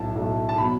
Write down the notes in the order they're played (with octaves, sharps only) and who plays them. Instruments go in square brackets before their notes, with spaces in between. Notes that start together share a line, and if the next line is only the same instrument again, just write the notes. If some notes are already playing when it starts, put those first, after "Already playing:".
Already playing: [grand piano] B1 A2 A3 [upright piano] A5
[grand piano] B1 A2 A3
[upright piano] A5
[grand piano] B2 F#3 [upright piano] B5